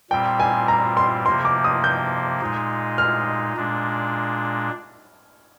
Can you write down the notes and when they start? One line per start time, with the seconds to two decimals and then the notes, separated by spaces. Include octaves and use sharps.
0.11 A#2 G3 C4 G5
0.40 G#5
0.68 A#5
0.97 C6
1.26 C3 F3 A#3 C6
1.45 D6
1.64 D#6
1.84 G6
2.41 A#2 G#3 D#4
2.98 F6
3.56 A#2 G#3 D4